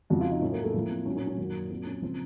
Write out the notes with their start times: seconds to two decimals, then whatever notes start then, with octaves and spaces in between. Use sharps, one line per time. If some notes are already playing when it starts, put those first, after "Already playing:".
0.10 F2 C#3 F3 F#4
0.21 F4
0.31 D#4
0.41 A2 F#3 C#4
0.52 A#3
0.64 A3
0.74 A2 F3 A#3
0.90 C4
1.06 A#2 F#3 C#4
1.17 C#4
1.27 C#4
1.38 F#2 D#3 F#3 A#3
1.70 A#2 F#3 C4
1.86 C#4
2.02 C#3 F3 C4